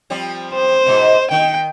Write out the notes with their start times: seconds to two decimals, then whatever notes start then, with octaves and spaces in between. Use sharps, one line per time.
0.10 F3 G3 C4
0.54 C5
0.86 G#2 B2
1.31 D#3 G5